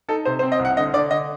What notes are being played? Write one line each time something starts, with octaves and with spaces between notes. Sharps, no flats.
D#4 A4
C3 C5
C5
C4
D#5
C2
F#5
D3 D#5
D3 D5
D3 D#5